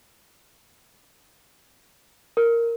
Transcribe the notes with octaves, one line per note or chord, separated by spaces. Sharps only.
A#4